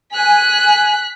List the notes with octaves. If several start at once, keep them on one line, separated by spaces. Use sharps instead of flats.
G#5 F#6 B6